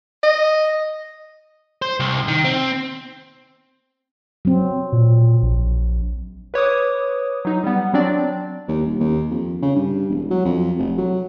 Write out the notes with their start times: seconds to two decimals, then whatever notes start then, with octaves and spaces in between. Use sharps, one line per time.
0.23 D#5
1.82 C5
2.00 C2
2.28 D#3
2.45 C4
4.45 F#3 C4
4.92 A#2
5.43 A#1
6.54 B4 C#5 D6 D#6
7.45 F#3 D#4
7.64 G3 B3
7.94 F#3 C4 D4 D5
8.68 D#2
8.86 D#1
9.00 D#2
9.31 F2
9.62 C#3
9.75 G2
10.09 E1
10.31 F#3
10.45 F2
10.79 F1
10.98 F#3